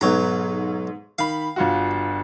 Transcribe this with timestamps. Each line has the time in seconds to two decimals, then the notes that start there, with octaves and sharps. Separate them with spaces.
0.01 B1 G#2 F#3 A#5
1.19 D#3 F5 B5
1.56 G1 F4 F#4